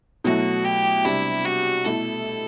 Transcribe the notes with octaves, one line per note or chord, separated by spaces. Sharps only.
B2 F#3 A3 E4 F#4
G4
C3 G3 D4 E4
F#4
B2 A3 E4 A4